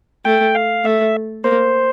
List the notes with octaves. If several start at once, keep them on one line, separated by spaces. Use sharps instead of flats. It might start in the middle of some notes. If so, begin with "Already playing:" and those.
A3 G5
F5
A3 E5
A#3 C5